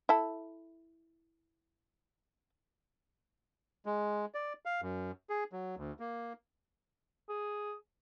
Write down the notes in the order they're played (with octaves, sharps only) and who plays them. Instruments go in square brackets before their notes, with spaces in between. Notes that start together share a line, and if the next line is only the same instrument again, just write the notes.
[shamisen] E4 A4
[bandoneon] G#3
D5
F5
F#2
G#4
F#3
D2
A#3
[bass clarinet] G#4